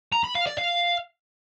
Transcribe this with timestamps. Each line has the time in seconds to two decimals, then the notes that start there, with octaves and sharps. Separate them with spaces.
0.12 A#5
0.24 B5
0.35 F5
0.47 D5
0.58 F5